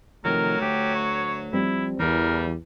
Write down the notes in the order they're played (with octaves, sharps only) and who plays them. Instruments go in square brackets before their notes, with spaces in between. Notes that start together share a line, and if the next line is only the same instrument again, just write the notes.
[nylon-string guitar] C3 D#3 F3 [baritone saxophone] F#3 [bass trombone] A3 [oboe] A#4
[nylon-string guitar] D2 [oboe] G4
[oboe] C#5
[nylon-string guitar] F3 G3 C4 [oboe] E4
[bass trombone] E2 [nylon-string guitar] E3 [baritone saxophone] G3 [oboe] A#4